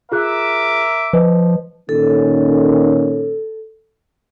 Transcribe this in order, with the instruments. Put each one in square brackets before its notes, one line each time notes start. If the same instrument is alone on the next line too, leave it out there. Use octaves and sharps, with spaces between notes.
[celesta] F4 G#4 F#6 [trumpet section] A#4 E5 D6
[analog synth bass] F3 [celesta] B4 D#5
[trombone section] A#2 D#3 C#4 [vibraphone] A4